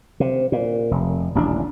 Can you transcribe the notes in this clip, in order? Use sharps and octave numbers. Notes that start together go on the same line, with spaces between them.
C3
A#2
F1
D#1 A1 C#4 D4